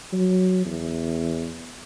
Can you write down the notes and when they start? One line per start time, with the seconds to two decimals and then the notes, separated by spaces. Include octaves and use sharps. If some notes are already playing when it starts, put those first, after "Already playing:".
0.13 F#3
0.66 E2